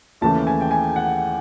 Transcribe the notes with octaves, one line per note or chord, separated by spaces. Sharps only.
D#2 C#3 E3 A3 A5
G#5
G5
G#5
F#5